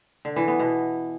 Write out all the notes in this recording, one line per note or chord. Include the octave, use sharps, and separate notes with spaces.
D3
E3
B3
B2